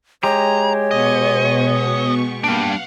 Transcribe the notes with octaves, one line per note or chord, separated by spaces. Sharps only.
G#3 G4 C#5 A#5
B2 B3 D#5 C#6
G3 A#3 D4 F5 F#5